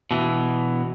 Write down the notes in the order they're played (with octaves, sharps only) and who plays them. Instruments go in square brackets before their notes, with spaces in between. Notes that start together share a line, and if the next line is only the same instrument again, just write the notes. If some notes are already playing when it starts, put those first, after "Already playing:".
[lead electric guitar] B2 E3